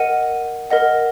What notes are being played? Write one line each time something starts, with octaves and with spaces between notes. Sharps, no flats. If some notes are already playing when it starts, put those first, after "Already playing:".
Already playing: A#4 D#5 F#5 D#7
A#4 D#5 F#5